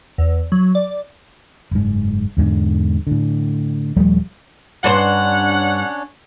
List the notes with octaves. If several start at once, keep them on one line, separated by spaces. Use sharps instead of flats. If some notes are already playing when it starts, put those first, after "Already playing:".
E2
F#3
D5
F#1 G#2
E2 G#2 D3
A2 D3
D#1 F3 G3 A3
G2 C#4 D4 C5 C#5 F#5